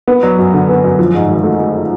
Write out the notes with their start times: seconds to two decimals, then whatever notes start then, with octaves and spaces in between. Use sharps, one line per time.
0.08 B3
0.23 F#3
0.38 F#2
0.53 D3
0.69 B3
0.83 F#2
0.99 F3
1.14 G#2
1.29 G#1
1.43 A3
1.59 A3